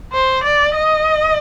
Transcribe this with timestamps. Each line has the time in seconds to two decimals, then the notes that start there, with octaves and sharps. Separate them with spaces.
0.13 C5
0.44 D5
0.75 D#5